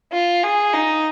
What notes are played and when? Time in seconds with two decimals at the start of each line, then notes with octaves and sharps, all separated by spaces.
0.13 F4
0.43 G#4
0.73 D#4